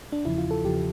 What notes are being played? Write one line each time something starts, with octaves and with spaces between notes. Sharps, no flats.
D4
E2 C#3 F3 E4
F4
A4
E2 C#3 F3 G4